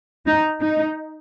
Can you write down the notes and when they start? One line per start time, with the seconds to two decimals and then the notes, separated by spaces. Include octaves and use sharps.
0.26 D#4
0.61 D#4